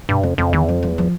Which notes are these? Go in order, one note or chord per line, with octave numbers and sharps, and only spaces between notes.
G2 B2
F2 C#3
F2 C#3
E2 D#3
F2 F3
F3
E2
F3